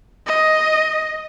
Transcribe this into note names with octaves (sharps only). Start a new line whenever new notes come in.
D#5